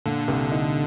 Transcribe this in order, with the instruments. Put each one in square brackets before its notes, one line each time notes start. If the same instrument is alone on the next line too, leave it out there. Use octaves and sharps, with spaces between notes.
[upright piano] A#2 [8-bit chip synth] D3
[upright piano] C2
D#4